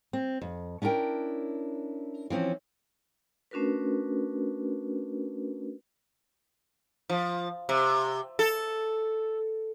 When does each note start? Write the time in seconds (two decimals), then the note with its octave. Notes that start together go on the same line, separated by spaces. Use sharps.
0.13 C4
0.42 F2
0.82 C#4 D4 E4 A#4 G5
2.30 E3 F3 C4 C#4
3.51 A3 C#4 D4 F#4 A#4 B4
7.10 F3
7.69 C3
8.39 A4